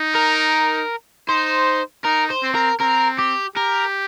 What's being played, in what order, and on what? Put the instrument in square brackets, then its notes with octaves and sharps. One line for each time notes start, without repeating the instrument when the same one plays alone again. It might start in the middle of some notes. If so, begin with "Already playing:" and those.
Already playing: [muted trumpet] D#4
[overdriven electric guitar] A#4
[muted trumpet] D#4 [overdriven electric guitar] C5
[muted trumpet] D#4 [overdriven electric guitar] A#4
[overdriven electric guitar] C5
[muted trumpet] C4
[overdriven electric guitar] A#4
[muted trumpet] C4 [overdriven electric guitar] A#4
[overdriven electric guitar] G4
[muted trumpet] G4 [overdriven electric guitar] A#4